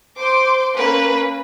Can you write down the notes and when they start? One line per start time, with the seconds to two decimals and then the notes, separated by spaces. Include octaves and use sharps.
0.17 C5 C6 D6
0.75 A#3 C#4 B4